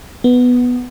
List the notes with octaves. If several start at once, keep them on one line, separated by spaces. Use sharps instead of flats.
B3